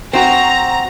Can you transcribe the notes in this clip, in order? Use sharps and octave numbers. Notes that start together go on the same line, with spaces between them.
C4 F#4 A#5